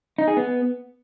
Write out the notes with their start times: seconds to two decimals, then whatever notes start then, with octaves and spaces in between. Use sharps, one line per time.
0.18 D#4
0.28 G#4
0.37 B3